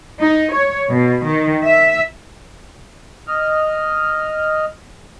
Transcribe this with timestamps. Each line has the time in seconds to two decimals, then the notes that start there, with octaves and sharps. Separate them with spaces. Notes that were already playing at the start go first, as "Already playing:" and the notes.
0.21 D#4
0.51 C#5
0.90 B2
1.26 D#3
1.63 E5
3.27 D#5 F6